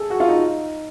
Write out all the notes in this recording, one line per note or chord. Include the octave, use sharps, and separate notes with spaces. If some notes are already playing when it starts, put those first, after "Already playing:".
Already playing: G#4 A4
F#4
F4
D#4